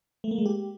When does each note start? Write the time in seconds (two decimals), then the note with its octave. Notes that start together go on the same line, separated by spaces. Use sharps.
0.24 A3
0.31 A#3
0.38 G#3
0.46 G4